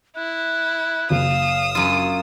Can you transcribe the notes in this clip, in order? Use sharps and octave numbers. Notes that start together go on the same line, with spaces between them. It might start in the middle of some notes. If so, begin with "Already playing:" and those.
E4 F#6
F#1 F5 D#6 E6
F#2 F4 D#7